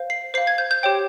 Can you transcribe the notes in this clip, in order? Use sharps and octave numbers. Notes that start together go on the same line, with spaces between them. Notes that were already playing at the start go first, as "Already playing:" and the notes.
Already playing: C5 F5
C7
C5 F5 C7
G#6
G6
G6
G4 C#5 G5